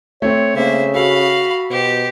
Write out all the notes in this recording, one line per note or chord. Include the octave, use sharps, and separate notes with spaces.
A3 C4 C#5
C#3 A#3 C5 E5
F#4 A4 F5 B5
B2 G4 C5